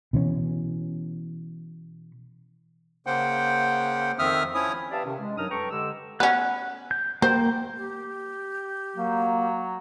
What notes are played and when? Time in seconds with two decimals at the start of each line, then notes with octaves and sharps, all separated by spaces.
0.13 B2 E3 C#4
3.06 C#3 A#3 C5 F#5 G5
4.19 F2 D#3 C4 E5 D#6 F6
4.54 F3 C#4 E4 C#5 D#6
4.91 G4 B4 D5 E5 F5 A5
5.04 C3 D#3 C#4
5.20 G#3
5.37 F#2 F#3 D4 D#4 D#6 F6
5.50 A4 B4 G5 A#5 C#6
5.71 D3 G#3 G4 E6
6.20 B3 C#4 F#6
6.91 G6
7.22 A#3 C5 G5
7.76 G4
8.97 F#3 A#3